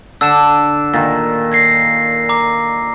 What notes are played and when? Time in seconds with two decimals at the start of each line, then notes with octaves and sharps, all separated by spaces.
0.21 D3 E6 F#6 E7
0.93 A#2 D#3
1.52 G#6 A#6 C7
2.29 A#5 D6